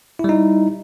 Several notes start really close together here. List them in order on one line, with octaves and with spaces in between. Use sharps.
E4 G3 D#4